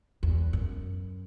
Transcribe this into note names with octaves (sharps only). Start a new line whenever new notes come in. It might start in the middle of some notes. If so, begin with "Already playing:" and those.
E2
F#2